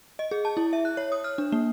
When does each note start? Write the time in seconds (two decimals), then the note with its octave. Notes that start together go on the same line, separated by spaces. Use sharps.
0.19 D#5
0.31 G#4
0.45 A5
0.57 E4
0.73 E5
0.85 F#6
0.97 C#5
1.12 D#6
1.24 F6
1.38 D4
1.52 A#3